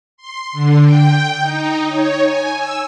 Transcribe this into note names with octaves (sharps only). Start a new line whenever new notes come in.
C6
D3
G5
D#4
C#5
G#5
E6